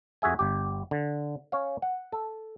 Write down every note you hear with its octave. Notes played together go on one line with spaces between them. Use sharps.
F2 F#4 G#4 E5 G#5
G1 G4
D3
C#4 C#5 F5
F#5
A4